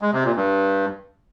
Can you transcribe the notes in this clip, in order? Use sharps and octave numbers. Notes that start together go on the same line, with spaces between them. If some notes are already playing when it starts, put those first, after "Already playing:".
G#3
C3
A#2
G2